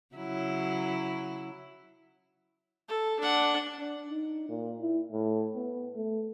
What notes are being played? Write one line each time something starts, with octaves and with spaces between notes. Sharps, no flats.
C#3 F#3 E4
A4
D4 F#5
D4
D#4
A#2
E4
A2
B3
A3